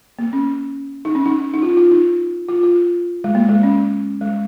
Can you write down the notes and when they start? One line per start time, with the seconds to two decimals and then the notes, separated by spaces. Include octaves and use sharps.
0.19 A#3
0.33 C#4
1.05 D#4
1.15 C#4
1.26 D#4
1.54 D#4
1.62 F4
1.77 F4
1.91 D#4
2.49 F4
2.63 F4
3.24 G#3
3.35 A#3
3.49 G#3
3.63 C#4
4.21 G#3